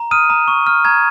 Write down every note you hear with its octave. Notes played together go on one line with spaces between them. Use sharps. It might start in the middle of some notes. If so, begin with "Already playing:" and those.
Already playing: A#5
D#6 F6 D#7
A#5
C#6
F6
A#5 G#6